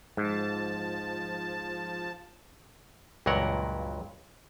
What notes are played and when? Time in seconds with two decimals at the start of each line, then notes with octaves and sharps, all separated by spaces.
0.17 G#2 F3 A5
3.26 C#2 G2 A#2 F#3 A#4 F#5